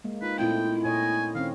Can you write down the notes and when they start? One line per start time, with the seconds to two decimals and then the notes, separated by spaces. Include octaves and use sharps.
0.04 G#3 A#3
0.22 D#4 F4 B4
0.39 A#2 A3 C4 E4 G5
0.85 A#2 C#5 D#5 G#5
1.35 D#3 C4 C#4 F5